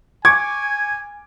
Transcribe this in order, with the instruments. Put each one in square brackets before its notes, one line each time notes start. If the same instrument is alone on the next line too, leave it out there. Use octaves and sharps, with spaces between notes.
[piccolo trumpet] G#5 [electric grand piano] C#6 D6 G#6